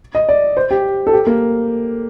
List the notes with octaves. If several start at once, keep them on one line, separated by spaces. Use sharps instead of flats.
D#5
D5
C5
G4
A4
G4
A#3